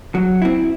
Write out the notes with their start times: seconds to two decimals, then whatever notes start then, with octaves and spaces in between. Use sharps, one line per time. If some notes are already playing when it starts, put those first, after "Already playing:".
0.15 F#3
0.42 C4 E4